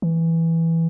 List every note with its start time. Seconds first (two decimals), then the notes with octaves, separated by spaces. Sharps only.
0.02 E3